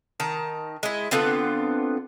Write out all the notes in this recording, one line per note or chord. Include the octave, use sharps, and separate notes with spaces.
D#3 A5 A#5
G#3 E4
D3 B3 C4 F4